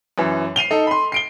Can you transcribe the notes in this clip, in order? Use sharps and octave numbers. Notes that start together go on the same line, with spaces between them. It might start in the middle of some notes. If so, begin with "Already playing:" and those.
F#2 E3
C7 D#7 F7 G7
D#4 A4
B5 C6
C7 D7 G7